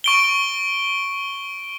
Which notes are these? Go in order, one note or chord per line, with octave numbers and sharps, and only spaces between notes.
C#6 D7 G7